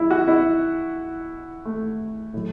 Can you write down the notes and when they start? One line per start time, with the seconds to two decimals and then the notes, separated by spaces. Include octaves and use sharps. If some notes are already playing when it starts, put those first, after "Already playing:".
Already playing: F#3 E4
0.11 F#4
0.28 E4
1.65 A3
2.34 A2 F#3